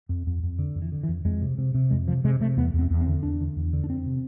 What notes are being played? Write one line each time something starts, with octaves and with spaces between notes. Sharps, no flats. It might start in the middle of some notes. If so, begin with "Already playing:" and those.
F2
F2
F2
D3
F2
E3
D3
E3
F2
F2 G#3
C3
C3
C3
F2 G#3
C3 F3
C3 G#3
C3 A3
E2 B3
E2
C4
E2
C4
D3
E2 D4
D3
E2
D3
D4
F2 C4
C3